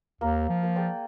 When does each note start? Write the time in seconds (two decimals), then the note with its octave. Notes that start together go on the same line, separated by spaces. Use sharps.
0.21 D#2 A#3
0.49 F3
0.63 A#3
0.76 G#4 D5 G5